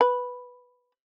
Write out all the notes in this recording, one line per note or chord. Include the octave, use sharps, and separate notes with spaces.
B4